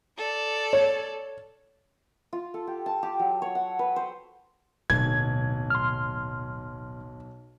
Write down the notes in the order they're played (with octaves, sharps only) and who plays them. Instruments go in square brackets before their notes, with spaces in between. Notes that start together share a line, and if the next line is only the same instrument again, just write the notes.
[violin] A4 D5
[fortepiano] C#5
[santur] F4
A4
G4
A5
G4
F#3
C#5
F#5
B4
C5
[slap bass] D1 [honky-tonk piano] B1 [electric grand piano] G#6
[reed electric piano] C6 F6